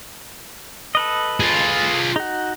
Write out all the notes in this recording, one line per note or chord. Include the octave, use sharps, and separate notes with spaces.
A4 B4 D#5
F4 G#4
D#4 F#4